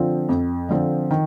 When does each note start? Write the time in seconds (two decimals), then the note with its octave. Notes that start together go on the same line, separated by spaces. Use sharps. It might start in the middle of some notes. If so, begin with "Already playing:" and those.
Already playing: D3 F3 C4 F4
0.29 F2
0.69 D3 F3 C4 F4
1.11 D#3